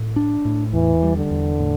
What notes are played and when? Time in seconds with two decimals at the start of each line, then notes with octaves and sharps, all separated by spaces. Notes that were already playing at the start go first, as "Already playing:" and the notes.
Already playing: A2
0.16 D4
0.45 A2
0.74 E2 E3
1.03 G3
1.17 D3
1.31 E2
1.60 A2